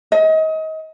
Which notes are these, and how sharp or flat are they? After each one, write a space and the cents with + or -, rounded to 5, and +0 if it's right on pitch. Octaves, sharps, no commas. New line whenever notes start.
D#5 +30